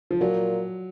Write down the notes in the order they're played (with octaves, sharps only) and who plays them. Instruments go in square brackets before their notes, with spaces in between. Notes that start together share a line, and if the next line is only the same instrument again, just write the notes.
[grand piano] F3
[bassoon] A#2 [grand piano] F#3